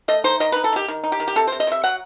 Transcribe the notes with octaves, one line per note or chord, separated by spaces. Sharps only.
A3 D#5
D#4 C5
D#3 D#5
B4
D#4
A4
D#3 G4
D#3
D#4
G4
D#3
G4
C3 A4
C5
C3
D#5
C3 E5
F#3 F#5